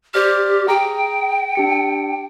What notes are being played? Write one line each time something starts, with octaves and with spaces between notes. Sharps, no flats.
G4 C5 D5 F6
G#4 G5 A#5
D4 G4 C#7